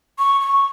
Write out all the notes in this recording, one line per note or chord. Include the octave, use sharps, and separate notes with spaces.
C#6
C#6